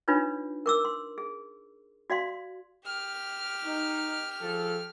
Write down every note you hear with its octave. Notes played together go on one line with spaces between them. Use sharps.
D4 D#4 F4 B4 C#5
A#4 D6 E6
C6
G#4
F#4 D5 F5 C6
G4 F6
D#4
F3 G#4 A4